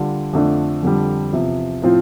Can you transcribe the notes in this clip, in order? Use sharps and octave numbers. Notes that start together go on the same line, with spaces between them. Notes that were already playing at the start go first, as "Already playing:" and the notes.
Already playing: D3 G3 D4 F4
F2 D3 F3 A3 D4
F2 D3 G3
E2 C3 F3
A2 F3 C4 F4